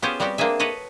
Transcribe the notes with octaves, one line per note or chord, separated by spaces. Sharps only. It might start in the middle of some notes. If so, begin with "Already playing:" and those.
B3 C#4 F4 G4 G#4 C5
G3 B3 C4 F#4 G4
A#3 C4 D4 G#4 E5
A4 B4 C#5 D#5